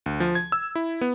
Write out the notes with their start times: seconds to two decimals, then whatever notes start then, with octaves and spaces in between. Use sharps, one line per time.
0.06 D2
0.20 F3
0.35 G#6
0.52 E6
0.75 E4
1.01 B3